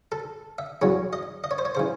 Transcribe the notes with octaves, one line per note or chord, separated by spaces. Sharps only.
A4
E5
E2 C#3 F#3 C#5
D#5
D#5
C#5
C5
C#5
C#3 E3 C5